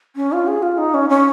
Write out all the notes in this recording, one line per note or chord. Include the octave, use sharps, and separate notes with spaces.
C#4
F4
G#4
F4
D#4
C#4
C#4